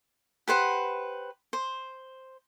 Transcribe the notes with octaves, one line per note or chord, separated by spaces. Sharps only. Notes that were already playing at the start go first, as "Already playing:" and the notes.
G4 B4 C5 F#5
C5